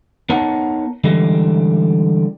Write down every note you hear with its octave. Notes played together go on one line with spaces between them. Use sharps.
B3 D#4 A#4 C#5 F#5 A5
D3 E3 G3 G#3